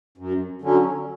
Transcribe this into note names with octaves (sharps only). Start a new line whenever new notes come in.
F#2
D3 F#3 C#4